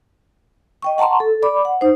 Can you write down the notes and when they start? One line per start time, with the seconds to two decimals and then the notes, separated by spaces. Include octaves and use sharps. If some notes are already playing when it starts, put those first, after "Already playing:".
0.82 D#5 G5 C#6
0.98 F#5 A5 A#5 C6 C#6
1.20 A4
1.43 D5 B5 D6
1.65 F#5
1.81 D#4 C5